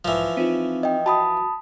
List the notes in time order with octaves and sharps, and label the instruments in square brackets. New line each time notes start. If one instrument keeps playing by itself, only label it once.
[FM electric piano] B1 G#2 [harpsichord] E3 F3
[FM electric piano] C4 D#4 F4
[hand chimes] D#5 G5
[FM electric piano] F#4 [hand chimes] A5 B5 D#6